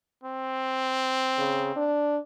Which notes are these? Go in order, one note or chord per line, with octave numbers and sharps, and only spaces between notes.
C4
C#3
D4